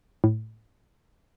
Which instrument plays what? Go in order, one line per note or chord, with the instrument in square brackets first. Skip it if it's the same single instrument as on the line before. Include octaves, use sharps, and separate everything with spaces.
[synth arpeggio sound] A2